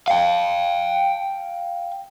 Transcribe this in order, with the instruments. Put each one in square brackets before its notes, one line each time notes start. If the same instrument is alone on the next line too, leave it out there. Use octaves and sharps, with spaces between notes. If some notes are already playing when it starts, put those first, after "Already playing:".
[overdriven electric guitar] F5 G5